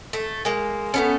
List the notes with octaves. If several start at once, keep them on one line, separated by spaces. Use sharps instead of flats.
A3
G#3 A#3
A3 B3 C#4